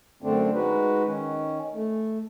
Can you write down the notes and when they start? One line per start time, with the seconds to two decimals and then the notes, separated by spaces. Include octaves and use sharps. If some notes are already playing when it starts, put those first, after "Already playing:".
0.22 F#2 D3 A3 C4 D4
0.54 G#3 D#4 F#4 B4
1.06 D#3 C#4
1.73 A3